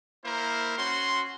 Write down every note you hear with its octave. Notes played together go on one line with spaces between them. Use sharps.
A#3 E4 A#4 C5
C#4 F#4 C6